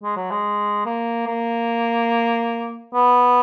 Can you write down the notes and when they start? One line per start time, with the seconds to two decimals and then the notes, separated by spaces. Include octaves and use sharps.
0.03 G#3
0.17 F#3
0.31 G#3
0.86 A#3
1.27 A#3
2.94 B3